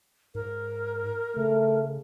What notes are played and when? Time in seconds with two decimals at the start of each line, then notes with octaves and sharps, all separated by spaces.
0.35 G#2 A#4
1.36 C#3 A3